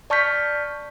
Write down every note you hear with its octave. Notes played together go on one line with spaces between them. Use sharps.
D5 A5 C#6 F6 G6 B6